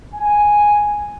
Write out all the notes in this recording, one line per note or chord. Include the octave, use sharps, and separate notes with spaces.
G#5